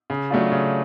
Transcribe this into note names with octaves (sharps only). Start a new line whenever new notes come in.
C#3
F#3 A3 D4 F4
C#3